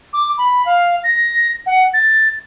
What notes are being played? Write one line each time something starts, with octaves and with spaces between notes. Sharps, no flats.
D6
B5
F5
A#6
F#5
A6